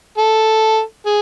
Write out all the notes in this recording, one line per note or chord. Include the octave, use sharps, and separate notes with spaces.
A4
G#4